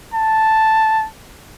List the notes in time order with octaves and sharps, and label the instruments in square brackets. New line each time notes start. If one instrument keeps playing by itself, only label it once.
[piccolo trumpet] A5